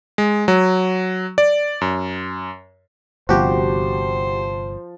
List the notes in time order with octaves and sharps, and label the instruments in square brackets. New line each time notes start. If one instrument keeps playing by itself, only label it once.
[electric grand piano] G#3
F#3
D5
F#2
[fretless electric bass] G1 C3 [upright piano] F3 [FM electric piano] F#4 G4 [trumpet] C5